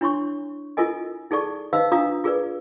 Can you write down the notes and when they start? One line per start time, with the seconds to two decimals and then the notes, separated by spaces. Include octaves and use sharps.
0.01 D4 E4 C#5 C6 C#6
0.77 E4 F4 A4 A#4 D#5 G#5
1.31 D#4 G#4 A4 D5 C#6
1.73 D#4 B4 C5 D#5 F5 E6
1.92 D4 F4 F5 A#5 D#6
2.24 F4 G#4 A#4 B4 D5